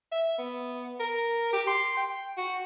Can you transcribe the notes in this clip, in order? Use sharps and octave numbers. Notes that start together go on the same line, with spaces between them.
E5
B3
A#4
G4
C6
G5
F#4